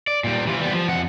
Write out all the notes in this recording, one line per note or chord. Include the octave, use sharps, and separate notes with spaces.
D5
A#2 G3
E3 F4
G3 B3
F3
F2 F#5